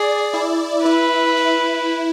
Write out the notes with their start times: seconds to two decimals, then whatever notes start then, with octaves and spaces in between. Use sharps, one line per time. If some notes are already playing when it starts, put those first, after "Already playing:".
Already playing: G#4 D5
0.33 E4
0.85 E4 B4
1.37 E4